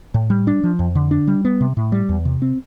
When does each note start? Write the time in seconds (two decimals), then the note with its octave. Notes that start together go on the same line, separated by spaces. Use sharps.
0.14 A2
0.30 G3
0.47 D4
0.64 F3
0.79 F2
0.95 D3
1.11 D4
1.27 G3
1.45 B3
1.61 C3
1.77 A2
1.92 G3
2.09 E2
2.25 C3
2.42 C4